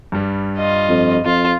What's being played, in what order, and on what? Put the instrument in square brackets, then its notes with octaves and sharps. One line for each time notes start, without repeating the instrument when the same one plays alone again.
[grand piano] G2 G3
[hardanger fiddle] F4 D#5
[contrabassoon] F2
[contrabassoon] F2 [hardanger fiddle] F4